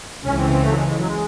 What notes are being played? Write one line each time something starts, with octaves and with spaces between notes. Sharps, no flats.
C#2 C#3 E3 C#4
C4
A3
C4
A3
F#3
G#3
G#3
F#3
G#3